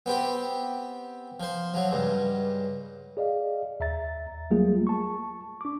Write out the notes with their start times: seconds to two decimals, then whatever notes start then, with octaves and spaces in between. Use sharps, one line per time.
0.06 B3 C4 G4
1.40 F3 C5
1.74 F3 F#3
1.91 C#2 G2
3.17 G#4 D5 D#5 F5
3.80 D#2 E5 A#5 A6
4.51 F#3 G3 A3 A#3 F4 G#4
4.87 A5 C#6
5.61 D4 D6